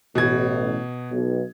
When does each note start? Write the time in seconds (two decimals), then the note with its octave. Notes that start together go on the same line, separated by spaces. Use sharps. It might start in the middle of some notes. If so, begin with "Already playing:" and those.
0.15 A1 B2 G#6
1.12 B1